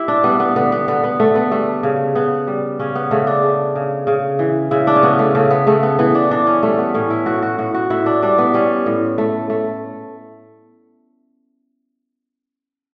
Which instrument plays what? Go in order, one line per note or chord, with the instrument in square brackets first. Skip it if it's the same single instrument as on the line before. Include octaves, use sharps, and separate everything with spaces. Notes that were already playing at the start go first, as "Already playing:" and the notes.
Already playing: [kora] E4 G4
D4
G3 B3
B3
D3 B3
B3
D3 B3
B3
D3 A3
B3
G3 A3
C#3
C#3 B3
G3
C#3 C#4
B3
C#3 A3
D4
C#3
C#3
C#3
E3
C#3 E4
D4
C#4
C#3 B3
A3
C#3 A3
B3
C#3 A3
B3
E3 B3
D4
E3 D4
C#4
G3 A3
B3
A2 C#4
E4
A2 F#4
F#4
A2 F#4
F#4
A2 E4
D4
G3 D4
B3
G3 C#4
A2
A3
A3